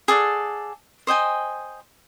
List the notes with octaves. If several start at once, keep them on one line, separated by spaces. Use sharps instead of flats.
G#4 A4 D5 F#5
C5 D#5 G5 G#5